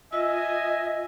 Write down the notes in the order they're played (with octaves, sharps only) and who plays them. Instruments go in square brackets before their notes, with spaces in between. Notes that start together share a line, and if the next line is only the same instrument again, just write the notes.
[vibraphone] F4 [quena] D#5 [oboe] E5 [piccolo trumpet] G#5